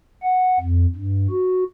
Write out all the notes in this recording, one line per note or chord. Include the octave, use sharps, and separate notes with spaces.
F#5
F2
G2
F#4